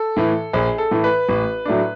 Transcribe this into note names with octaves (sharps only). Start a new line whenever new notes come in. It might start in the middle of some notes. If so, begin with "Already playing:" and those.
Already playing: A4
A2 E3
A#1 G#4
A4
A2 E3
B4
A1
A2 F#3 A3 D4